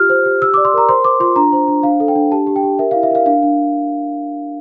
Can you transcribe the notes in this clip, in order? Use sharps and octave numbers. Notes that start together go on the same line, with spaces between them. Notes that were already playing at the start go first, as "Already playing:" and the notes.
Already playing: F4 G4 F6
C5
G4
G4 E6
D5 D6
C6
A#4 A#5
C5 C6
C5 D6
F4 C6
D4 A#5
C5
D4
D4 F5
A4
G5
D4
G4 A5
G4
G5
G4
A#4 E5
E4 F5
E5
A#4 F5
D4 F5
D4